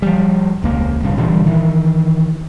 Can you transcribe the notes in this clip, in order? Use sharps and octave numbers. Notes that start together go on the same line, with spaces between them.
F3 G3
E1 C#2 A#3
D1 A#1 G2 C#3
A#2 D3 E3 G3
D#3 E3